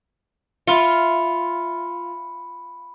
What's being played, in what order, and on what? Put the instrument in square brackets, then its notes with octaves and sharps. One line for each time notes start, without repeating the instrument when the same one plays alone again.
[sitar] F4 [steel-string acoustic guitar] E5 [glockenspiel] B5 C#7